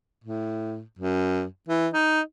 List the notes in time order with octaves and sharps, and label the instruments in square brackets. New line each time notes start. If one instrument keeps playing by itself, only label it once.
[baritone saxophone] A2
F#2
E3
D#4